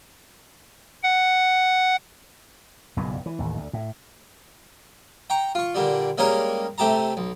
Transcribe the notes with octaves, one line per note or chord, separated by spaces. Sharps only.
F#5
F#1 B1 G2 A#2
E3
A1 D#2
D2
A2
G5 A#5 C#6
F4 C#6
A#2 D3 G3
G3 G#3 A#3 C#4 A#4 C#5
C3 A3 G4 A5 A#5
B1